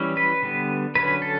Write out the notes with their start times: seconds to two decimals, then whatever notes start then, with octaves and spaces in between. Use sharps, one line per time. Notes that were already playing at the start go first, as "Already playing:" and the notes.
Already playing: E3 G3 C#4
0.17 B4
0.43 D3 G3 B3
0.95 D3 F#3 C#4 B4
1.22 A4